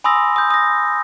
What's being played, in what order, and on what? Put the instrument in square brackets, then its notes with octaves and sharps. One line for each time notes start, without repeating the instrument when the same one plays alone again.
[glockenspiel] G#5 B5 C6 D#6 E6 A#6
D#6 G6
D#6 A#6